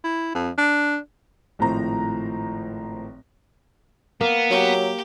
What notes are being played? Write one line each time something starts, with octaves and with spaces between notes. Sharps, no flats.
E4
F2
D4
G#1 A2 F3 C5 A#5
A#3 B3
F#3 G4